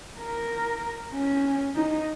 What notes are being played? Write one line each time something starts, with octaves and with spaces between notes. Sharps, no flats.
A#4
C#4
D#4